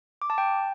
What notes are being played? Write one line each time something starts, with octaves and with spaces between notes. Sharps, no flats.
D6
A5
G5